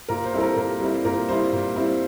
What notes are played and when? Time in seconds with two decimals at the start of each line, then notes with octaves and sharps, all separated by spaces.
0.09 A#2 A#4
0.25 C5
0.33 G3 C4 E4 A4
0.40 A#4
0.56 A#2 A#4
0.80 G3 C4 E4
1.04 A#2 A#4
1.28 G3 C4 E4 C5
1.53 A#2
1.76 G3 C4 E4